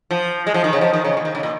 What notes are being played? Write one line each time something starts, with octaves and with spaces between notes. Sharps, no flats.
F3
G#3
F3
D#3
C#3
F3
D#3
C#3
A#2
D#3
C#3
A#2